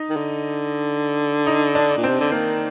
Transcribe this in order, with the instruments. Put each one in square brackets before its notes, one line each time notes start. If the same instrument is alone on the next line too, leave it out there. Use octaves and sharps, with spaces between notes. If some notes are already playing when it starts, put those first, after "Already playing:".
Already playing: [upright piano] D#4
[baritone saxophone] D#3
D3
[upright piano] D#4
D4
[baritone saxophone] A#2
[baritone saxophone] C3 [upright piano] C4
[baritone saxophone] D3
[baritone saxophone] D#3 [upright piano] A#3